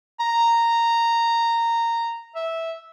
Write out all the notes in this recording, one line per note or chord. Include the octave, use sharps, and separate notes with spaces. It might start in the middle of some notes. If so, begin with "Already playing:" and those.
A#5
E5